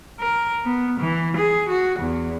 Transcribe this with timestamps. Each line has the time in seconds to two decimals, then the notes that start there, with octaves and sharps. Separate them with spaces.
0.20 A#4
0.65 B3
1.00 E3
1.37 G#4
1.69 F#4
2.00 E2